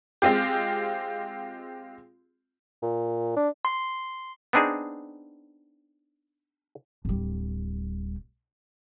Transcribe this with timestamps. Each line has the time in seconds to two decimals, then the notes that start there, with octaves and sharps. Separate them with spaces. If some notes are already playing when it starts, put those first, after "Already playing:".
0.22 G#3 C4 F4 G4
2.82 A#2
3.36 D4
3.65 C6
4.53 B3 C4 D4 D#4 G#4
7.05 D1 G3